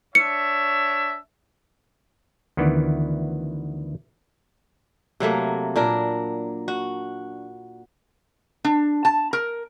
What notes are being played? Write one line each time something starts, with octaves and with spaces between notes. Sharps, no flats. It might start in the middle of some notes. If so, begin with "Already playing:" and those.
D4 C#5 E5 C#7
D2 D#3 E3 B3 E4 D5
C3 F#3 A3 A#3
A#2 D4 A#4
F#4
D4
A5
A#4